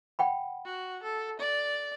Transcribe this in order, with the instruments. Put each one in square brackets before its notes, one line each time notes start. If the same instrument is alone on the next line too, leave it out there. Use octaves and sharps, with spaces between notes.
[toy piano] F#5 G5 B5
[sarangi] F#4
A4
D5